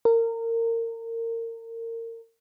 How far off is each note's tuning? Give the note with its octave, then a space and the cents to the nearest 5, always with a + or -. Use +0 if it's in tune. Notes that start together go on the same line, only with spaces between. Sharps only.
A#4 -30